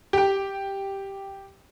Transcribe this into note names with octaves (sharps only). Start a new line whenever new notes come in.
G4 G5